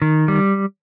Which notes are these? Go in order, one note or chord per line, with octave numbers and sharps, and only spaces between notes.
D#3
G3